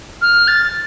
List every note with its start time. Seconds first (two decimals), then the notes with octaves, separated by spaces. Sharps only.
0.22 F6
0.48 A6